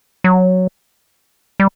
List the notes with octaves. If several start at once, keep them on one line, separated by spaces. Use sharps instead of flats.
F#3
G3